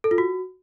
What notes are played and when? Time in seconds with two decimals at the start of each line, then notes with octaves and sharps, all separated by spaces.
0.04 A4
0.11 F4
0.18 F#4